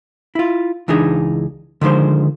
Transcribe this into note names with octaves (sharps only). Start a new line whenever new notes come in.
E4 F4
C#2 E3 D4 D#4 G#4
D3 D#3 F3 G#3 C5